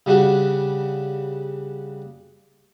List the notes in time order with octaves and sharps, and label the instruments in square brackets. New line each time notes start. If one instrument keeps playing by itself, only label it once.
[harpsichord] C#3 G3 D4 F#4